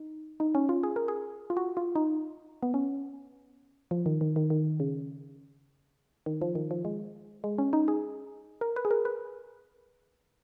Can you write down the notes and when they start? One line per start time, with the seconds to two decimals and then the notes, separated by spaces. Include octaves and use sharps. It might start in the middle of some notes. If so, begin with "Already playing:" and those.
Already playing: D#4
0.40 D#4
0.55 C#4
0.69 F4
0.83 G#4
0.96 A#4
1.08 G#4
1.50 F4
1.57 F#4
1.77 F4
1.95 D#4
2.62 B3
2.74 C#4
3.91 F3
4.06 D#3
4.21 D#3
4.36 D#3
4.50 D#3
4.80 C#3
6.26 D#3
6.41 F3
6.55 D#3
6.71 F3
6.85 G#3
7.44 G#3
7.58 C#4
7.73 D#4
7.88 G#4
8.61 A#4
8.76 B4
8.85 G#4
8.91 A#4
9.05 B4